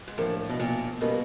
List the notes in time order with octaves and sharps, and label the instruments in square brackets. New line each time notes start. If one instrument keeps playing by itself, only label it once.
[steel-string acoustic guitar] G#2
[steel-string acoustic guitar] A2 [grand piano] F3 A#3 D4
[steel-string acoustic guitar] B2
A#2
[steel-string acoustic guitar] B2 [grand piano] G3 A#3 C#4